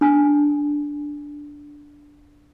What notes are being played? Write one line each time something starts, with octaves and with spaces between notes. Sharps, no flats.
D4 G#5